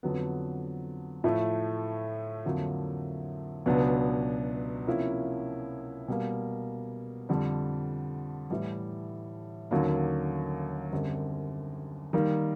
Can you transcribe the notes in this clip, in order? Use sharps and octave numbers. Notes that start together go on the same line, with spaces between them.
F2 D3 F#3 B3
A2 F3 A3
F2 D3 F#3 A#3
C#2 B2 F#3 B3 D4
C3 F3 A#3 C#4 E4
B2 G3 A#3
F2 D3 G3
A2 E3 G3
D#2 D3 F#3 A#3 C#4
F#2 D3 G3 C4
D#3 G3 A#3